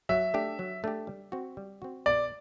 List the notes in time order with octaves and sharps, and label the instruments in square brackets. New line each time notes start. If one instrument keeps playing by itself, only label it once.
[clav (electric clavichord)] F#3 [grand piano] E5
[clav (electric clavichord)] A3 D4 G4
F#3
A3 D4 G4
G3
C4 F#4
G3
C4 F#4
[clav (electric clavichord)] B2 [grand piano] D5